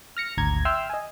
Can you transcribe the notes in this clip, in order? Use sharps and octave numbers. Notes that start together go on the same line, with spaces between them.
F6 A#6 C#7
G#1 D2 A#5 G#6
E5 G5 C6 E6 F6
D#5 G#5